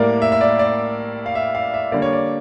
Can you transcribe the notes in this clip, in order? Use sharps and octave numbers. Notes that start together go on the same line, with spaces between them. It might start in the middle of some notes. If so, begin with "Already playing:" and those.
Already playing: A2 G3 A#3 A#4 D5
E5
E5
D5
D5
F5
E5
F5
E5
D3 G3 A#3 D5
C#5
D5